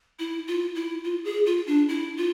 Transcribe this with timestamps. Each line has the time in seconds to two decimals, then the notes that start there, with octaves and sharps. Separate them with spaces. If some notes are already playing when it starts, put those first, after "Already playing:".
0.19 E4
0.48 F4
0.75 E4
1.04 F4
1.25 G#4
1.46 F4
1.67 D4
1.89 E4
2.17 F4